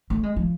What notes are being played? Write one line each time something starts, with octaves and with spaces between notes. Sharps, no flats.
A3
G#3
F3